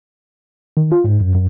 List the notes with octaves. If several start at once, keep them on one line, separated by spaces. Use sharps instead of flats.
D#3
F4
G#2
F#2
F#2